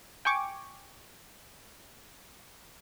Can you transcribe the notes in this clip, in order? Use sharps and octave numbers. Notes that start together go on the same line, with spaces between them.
G5 G#5 C#6 D6